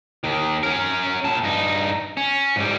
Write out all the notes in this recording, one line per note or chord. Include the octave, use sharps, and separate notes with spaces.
D#2 D#3
C#4 A#4
A#2 A5
G2 D#4
C#4
G#2 G3